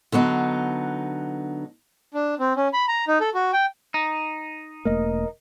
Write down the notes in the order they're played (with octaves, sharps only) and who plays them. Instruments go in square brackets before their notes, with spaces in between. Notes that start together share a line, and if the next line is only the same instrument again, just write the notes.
[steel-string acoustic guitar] D3 F#3 B3 D#4
[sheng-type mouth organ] D4
C4
C#4
B5
A#5
D#4
A4
F#4
G5
[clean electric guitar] D#4
[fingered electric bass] E1 A3 A#3 [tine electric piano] A#4 D#5